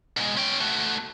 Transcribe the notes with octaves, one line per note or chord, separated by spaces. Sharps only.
B2 G#3
C#4 G5
A3 F#4